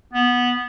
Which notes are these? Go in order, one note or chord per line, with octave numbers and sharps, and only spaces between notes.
B3